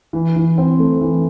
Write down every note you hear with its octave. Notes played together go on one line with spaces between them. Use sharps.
E3
E3
C4
A3
E3